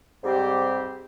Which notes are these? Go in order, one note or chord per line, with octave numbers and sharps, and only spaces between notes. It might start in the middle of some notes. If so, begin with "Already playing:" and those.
G#2 G3 C4 G4 C5